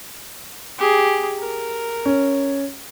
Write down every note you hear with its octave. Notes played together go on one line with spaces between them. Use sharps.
G4 G#4
A#4
C#4